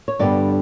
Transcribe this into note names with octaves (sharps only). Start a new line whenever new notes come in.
C#5
G2 D3 G3 B3 D5